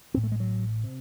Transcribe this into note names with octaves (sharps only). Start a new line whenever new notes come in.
A1 A2 C4
A3
G#3
F#3
C3